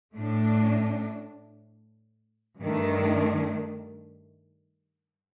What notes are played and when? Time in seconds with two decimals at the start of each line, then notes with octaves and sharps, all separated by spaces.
0.13 A2 A3 D4
2.62 G2 D#3 A3 D4